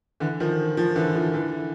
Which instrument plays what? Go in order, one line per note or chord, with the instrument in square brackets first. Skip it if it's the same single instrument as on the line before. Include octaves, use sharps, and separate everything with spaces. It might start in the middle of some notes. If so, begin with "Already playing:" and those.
[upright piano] D3 E3
D#3 F3
D#3 F3
D3 E3
D#3 F3
D3 E3